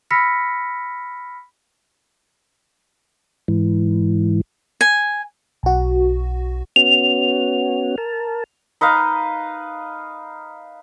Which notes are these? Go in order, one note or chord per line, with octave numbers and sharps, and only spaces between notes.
B5 E6 F6 A#6 B6 C#7
G#2 E3
G#5
B1 F#4
B3 C#4 F#4 F7
A#4 A5
D#4 B4 D#5 F5